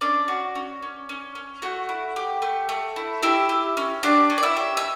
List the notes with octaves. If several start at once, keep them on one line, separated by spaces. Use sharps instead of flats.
C#4 D4 D5
F#4
C#4
C#4
C#4
C#4
A3 F#4 F#5
E4
G4
A3
A3
E4
E4 G4 E5
G4
C#4
D4 G4 D5
C#4
D5
E4 E5
G4
E5